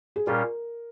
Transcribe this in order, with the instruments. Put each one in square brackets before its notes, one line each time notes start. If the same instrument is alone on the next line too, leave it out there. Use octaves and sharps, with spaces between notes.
[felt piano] G#4
[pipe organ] A#2 G3 C#4 F4 [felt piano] A#4